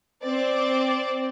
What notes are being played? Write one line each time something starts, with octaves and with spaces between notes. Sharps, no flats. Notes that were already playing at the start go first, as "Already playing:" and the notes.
C4 D5